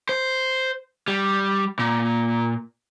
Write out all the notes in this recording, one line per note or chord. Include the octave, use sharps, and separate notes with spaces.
C5
G3
A#2